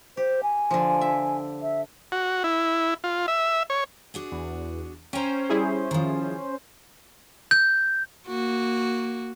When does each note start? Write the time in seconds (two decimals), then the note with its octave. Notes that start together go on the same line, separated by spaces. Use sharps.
0.17 G4 C5
0.43 G#5
0.71 D3 F3
1.01 E5
1.62 E5
2.12 F#4
2.44 E4
3.04 F4
3.28 E5
3.70 C#5
4.14 D4 F#4 G#4
4.32 E2
5.13 C#4 C5 G5 A#5
5.50 G3 E4 G#4
5.91 D#3 F3
7.51 G6
8.27 A#3 F#4